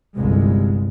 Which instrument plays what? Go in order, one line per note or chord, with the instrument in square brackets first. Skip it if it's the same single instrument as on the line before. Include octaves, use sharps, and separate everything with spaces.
[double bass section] G1 C2 G#3